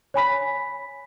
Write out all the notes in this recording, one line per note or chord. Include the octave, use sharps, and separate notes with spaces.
C#5 G#5 B5 B6